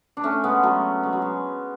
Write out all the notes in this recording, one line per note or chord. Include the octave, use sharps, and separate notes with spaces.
D4
A3 C#4
G#3 B3
F#3 A3
G#3
F#3
G#3